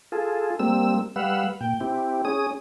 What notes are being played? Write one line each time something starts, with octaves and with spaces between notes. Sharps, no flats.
F4 G#4 A4
G3 A#3 C4 E6
G3 B4 F5 F#5 E6
A#2 G5
C4 E4 G4
C#4 G#4 D#6